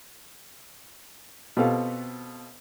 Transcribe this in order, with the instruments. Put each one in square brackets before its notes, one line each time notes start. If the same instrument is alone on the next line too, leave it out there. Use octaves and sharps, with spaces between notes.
[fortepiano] B2 B3 C4 F4 G4 A4